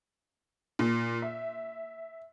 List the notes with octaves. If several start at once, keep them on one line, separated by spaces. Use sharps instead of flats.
A#2
E5